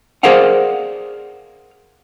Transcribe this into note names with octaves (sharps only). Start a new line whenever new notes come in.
G#4 A#4 C5 D5 F5 F#5